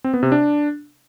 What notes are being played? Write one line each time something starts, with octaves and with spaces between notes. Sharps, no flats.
C4
B3
C3
D4